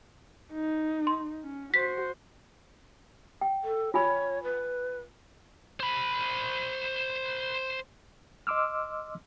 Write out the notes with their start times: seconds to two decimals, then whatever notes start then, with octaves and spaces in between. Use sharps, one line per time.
0.53 D#4
1.07 C6
1.44 C#4
1.74 F#4 C5 B6
3.41 G5
3.64 A4
3.94 F4 C#5 G#5 B5
4.44 B4
5.80 C5 B5
8.47 D#5 C6 D6 E6 F6